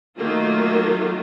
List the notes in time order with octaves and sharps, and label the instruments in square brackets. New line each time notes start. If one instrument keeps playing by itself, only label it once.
[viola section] D#3 F#3 A3 A#3 F4